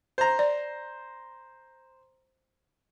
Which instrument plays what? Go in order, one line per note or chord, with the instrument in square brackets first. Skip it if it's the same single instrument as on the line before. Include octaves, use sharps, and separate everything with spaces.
[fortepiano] C5 A#5
[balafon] D5